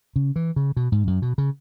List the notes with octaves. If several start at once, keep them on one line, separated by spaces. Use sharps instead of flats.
C#3
E3
C#3
B2
G#2
F#2
B2
C#3